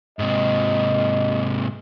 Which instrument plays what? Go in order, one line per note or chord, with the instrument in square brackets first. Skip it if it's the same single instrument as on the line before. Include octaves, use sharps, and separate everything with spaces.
[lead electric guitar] G#2 C3 [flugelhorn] D#5